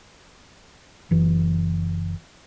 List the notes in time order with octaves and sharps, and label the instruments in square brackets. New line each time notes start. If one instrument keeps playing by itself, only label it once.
[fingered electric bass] F#1 E3